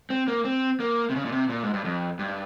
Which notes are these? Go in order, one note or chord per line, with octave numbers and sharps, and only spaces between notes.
C4
A#3
C4
A#3
C3
C#3
A#2
C3
A#2
G#2
G2
F2
G2